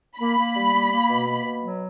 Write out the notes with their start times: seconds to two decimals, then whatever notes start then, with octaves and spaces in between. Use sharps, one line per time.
0.20 A#3 B5
0.38 A#3
0.56 G3
0.74 A#3
0.91 A#3
1.09 B2
1.27 A#3
1.45 B2
1.62 F#3